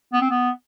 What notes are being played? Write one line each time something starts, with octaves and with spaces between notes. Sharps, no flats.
B3
C4
B3